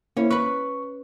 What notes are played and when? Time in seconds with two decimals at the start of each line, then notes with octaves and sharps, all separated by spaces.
0.17 A#3 C#4 E4
0.30 B4 B5 C#6